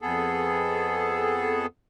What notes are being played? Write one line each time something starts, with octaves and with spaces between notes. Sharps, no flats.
F2 B3 G#4 A4